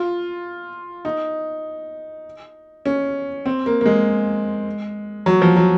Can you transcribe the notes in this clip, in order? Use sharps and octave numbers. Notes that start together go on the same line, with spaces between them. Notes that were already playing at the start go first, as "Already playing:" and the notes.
Already playing: F4
D#4
C#4
C4
A#3
A#3
G#3
F#3
F3
F#3